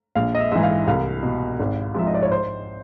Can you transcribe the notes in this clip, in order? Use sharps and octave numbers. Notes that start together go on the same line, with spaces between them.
A#1 F5
D#5
E5
G#2 E3 E5
F5
C2 F5
B2
G#1
G#2 F3 E5
D#5
D5
C#5
C5